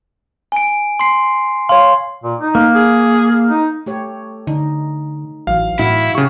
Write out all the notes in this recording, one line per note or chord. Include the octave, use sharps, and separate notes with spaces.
G#5 D7
C6 C7
C#5 F5 C6
A#2
D#4
A#3
G#4
D#4
A3 G4 C#5
D3 D#4
A1 E3 F#3 F5
A2 E4 F#4
C#3 G4 C#6